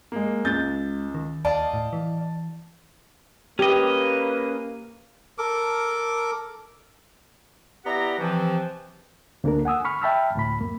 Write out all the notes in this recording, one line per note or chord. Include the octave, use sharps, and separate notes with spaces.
G#3 A#3
C#2 G#3 G6 A6
D#3
D#2 D5 D#5 F5 A5
A2
E3
A#3 C#4 G4 B4 D#5
A4 A#4 D6
B3 E4 G4 D5 F#5 A#5
C3 E3 F3
D2 A#3 D4 A4 A#4
F#5 G#5 D#6 E6
B5 C#6 F6
E5 G5 A5 B5 E6 F6
D2 A2 B5
F#2 A#3